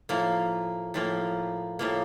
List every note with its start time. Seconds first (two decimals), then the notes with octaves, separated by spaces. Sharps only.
0.09 A2 F3 A#3
0.94 A2 F3 A#3
1.79 A2 F3 A#3